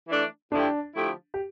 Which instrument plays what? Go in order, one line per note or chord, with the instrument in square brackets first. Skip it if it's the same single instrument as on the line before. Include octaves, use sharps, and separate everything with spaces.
[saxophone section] E3 A3 D4
[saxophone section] D3 F3 A3 E4 G4 [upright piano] D4
[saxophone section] D3 F3 A3 E4 G4
[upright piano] G4